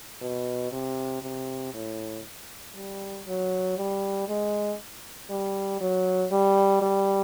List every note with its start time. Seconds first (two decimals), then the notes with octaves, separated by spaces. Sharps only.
0.22 B2
0.72 C3
1.23 C3
1.74 A2
2.75 G3
3.27 F#3
3.77 G3
4.28 G#3
5.30 G3
5.80 F#3
6.32 G3
6.82 G3